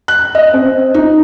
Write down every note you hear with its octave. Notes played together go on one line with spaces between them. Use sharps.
F#6
D#5
C4
D#4